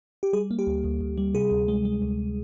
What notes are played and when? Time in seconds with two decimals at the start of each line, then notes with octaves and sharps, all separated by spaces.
0.23 G4
0.33 G3 G#4
0.51 A#3
0.59 G4
0.67 D2
0.84 D2
1.01 D2
1.18 G3
1.35 C3 G#4
1.51 D2
1.68 G#3
1.85 G#3
2.02 D2